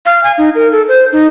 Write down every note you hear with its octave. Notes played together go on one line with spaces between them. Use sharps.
F5
G#5
D#4
A#4
A4
C5
D#4